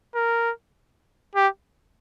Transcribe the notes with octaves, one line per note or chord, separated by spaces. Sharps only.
A#4
G4